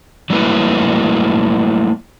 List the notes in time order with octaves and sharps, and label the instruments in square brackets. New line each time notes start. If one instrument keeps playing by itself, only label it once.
[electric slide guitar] F#3 G3 A3 A#3 E4 B4